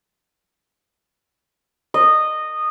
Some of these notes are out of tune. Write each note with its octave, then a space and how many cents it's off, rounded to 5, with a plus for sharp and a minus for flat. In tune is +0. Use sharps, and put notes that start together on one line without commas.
D#5 -15